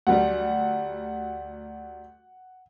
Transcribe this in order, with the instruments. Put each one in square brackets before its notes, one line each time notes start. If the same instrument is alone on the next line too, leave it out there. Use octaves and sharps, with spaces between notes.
[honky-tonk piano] D2 F#3 G3 [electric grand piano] F#5